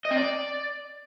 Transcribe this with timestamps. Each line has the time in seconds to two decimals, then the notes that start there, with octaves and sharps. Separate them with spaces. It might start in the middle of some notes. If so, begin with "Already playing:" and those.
0.05 D#5
0.11 C4
0.16 D5